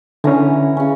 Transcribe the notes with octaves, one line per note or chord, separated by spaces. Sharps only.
D3 E3 C#4 E4 A#5
C#3 C#4